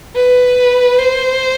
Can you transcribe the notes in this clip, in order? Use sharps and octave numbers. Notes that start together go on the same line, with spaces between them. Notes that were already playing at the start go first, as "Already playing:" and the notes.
B4
C5